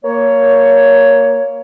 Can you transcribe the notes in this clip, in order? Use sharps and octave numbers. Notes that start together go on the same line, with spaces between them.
A#3 C#5